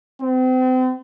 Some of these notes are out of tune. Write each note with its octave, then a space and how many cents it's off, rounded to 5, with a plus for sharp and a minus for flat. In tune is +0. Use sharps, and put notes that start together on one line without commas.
C4 -35